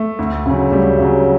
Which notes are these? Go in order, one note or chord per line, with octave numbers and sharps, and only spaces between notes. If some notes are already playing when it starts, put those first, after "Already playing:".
Already playing: A3
D2
C#3 F#3
D2 G3
C#3 F#3